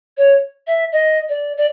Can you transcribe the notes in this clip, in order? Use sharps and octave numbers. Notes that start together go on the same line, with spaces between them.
C#5
E5
D#5
D5
D5